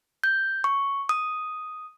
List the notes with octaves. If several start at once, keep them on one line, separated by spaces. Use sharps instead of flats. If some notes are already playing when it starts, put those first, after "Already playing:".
G6
C#6
D#6